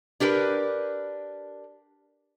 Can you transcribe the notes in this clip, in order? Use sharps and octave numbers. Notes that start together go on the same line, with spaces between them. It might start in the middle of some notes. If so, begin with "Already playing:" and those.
D4 G4 A#4 B4